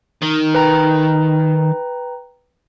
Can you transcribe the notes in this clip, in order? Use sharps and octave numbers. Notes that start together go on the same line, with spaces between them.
D#3
B4 G5 A#5